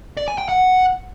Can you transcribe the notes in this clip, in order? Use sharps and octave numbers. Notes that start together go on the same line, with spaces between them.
D5
G#5
G5
F#5